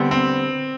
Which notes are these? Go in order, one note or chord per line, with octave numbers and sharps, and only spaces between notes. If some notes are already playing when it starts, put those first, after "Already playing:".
Already playing: D3 G3 B3 C4
C4